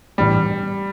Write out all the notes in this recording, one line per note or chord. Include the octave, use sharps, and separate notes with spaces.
A2 E3 G3 B3 D4